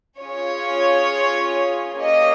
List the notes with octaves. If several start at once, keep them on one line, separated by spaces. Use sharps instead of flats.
C#4 F4 G#4 C#5
A#3 C#4 G4 D#5